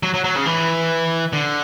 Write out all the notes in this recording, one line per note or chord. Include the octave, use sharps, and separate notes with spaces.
F#3
F#3
F#3
C#3
E3
D3